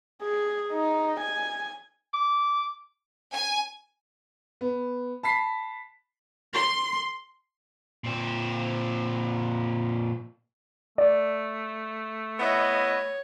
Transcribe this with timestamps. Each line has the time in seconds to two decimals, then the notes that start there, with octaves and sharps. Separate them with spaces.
0.22 G#4
0.72 D#4
1.20 G#5
2.13 D6
3.33 G#5
4.61 B3
5.23 A5 B5 B6 C7
6.54 C6
8.04 A#2 C4
10.98 A3 D5
12.40 B3 E4 C#5 D#5